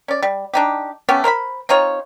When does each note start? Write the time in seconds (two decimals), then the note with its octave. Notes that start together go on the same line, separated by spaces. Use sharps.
0.08 C#4 D5
0.23 G3
0.54 D4 D#4 G4
1.09 A3 B3 C#4 G4
1.24 A#4 C5 E5 B5
1.69 C4 D#4 F4 C#5